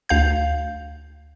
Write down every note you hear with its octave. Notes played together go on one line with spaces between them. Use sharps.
D2 F5 G6